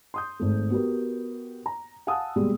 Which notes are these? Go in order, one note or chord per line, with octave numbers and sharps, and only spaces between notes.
C6 D#6 G6
G#1 A3
B3 F#4 G4 A#4
A#5
F5 F#5 G#5 A5 D#6 E6
D#1 B2 G3 G#3